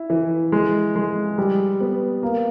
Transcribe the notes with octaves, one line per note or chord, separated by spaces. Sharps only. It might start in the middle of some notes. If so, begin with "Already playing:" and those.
Already playing: E4
E3
G#3
G#3
G3
B3
A#3